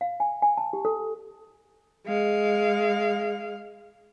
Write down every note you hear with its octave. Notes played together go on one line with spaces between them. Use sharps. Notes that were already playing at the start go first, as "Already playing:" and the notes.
F5
G#5
G#5
A5
G4
A4
G#3 F5